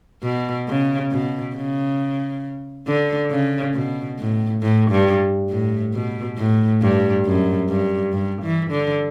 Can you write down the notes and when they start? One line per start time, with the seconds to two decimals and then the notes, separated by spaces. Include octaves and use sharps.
0.23 B2
0.68 C#3
1.12 B2
1.55 C#3
2.87 D3
3.31 C#3
3.74 B2
4.19 A2
4.62 A2
4.91 G2
5.49 A2
5.94 B2
6.38 A2
6.82 G2
7.26 F#2
7.69 G2
8.13 G2
8.42 E3
8.71 D3